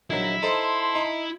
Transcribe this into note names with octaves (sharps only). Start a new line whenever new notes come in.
A#1 D#3 F#3 E4 D#5
D#4 A4 C5 A5 C6
D#4